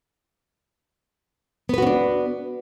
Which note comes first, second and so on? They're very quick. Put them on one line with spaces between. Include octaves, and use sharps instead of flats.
B3 B4 F#4 C#4 D4